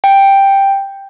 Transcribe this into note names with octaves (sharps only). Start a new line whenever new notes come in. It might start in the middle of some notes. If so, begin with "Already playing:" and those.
G5